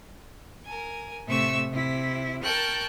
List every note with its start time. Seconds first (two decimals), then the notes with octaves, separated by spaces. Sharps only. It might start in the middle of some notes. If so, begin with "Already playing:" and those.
0.65 A#4 G#5
1.26 A2 C3 A3 E5 C#6 E6
1.70 C3 E4
2.43 A#4 G5 A5 C#6 F#6